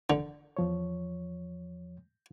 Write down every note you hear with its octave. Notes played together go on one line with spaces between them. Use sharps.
D3
E2 F3 C#5